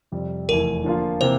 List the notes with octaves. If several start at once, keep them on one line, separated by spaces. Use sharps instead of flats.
F2 C3 G3
F1 E2 E3 A3 E4 A#4
D3 F3 A#3 F4
C3 E3 A#3 C5